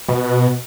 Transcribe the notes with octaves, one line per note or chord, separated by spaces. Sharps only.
B2